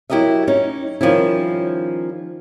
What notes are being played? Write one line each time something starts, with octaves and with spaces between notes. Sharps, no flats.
F#3 E4 G4 A#4 D#5 E5
C#4 D#4
D#3 F3 G3 C#4 E4